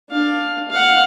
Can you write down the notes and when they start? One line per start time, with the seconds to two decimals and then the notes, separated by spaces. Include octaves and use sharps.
0.10 D4 F5
0.70 F5 F#5